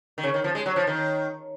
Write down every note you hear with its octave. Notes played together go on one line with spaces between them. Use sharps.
D#3
C#3
D#3
F3
G#3
F#3
F3
D#3